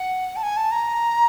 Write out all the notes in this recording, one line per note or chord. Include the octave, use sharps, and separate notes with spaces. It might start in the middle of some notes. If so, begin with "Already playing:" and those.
Already playing: F#5
A5
G#5
A5
A#5